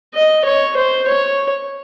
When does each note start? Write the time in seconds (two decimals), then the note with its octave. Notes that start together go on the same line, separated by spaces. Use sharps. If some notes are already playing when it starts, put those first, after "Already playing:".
0.14 D#5
0.45 C#5
0.77 C5
1.07 C#5